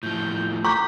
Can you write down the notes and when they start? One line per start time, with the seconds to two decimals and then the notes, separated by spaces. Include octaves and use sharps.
0.03 A2 F3 G6
0.65 A#5 C#6 D6 G6 B6